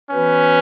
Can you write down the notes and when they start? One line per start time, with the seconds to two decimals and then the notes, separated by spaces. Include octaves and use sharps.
0.10 E3 B3 C#4 F#4 B4